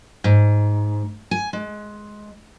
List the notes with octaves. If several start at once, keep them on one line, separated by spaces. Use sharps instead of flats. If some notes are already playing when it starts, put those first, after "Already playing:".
G#2
G#5
G#3